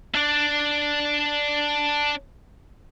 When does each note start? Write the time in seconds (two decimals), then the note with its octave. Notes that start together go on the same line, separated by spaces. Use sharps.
0.15 D4 D5